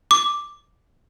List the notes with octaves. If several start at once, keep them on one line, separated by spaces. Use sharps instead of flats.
D6